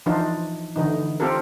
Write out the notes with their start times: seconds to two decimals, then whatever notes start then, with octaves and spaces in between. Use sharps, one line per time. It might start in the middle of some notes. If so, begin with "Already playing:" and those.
0.06 E3 F3 D4 D#4 F4
0.76 D3 E3 D#4
1.20 C4 F4 G4 A4 A#4